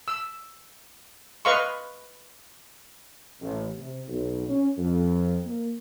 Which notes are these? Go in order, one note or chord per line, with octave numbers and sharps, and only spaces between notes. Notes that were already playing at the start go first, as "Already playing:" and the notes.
E6
B4 D#5 F5 C6 C#6
A1
C3
B1
C#4
F2
A#3